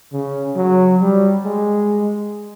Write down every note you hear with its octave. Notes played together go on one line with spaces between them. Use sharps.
C#3
F#3
G3
G#3